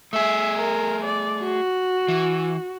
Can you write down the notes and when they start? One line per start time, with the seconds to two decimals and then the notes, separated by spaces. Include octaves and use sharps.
0.13 A3 G#4 E5
0.58 A#4
1.05 D5
1.43 F#4
2.08 E3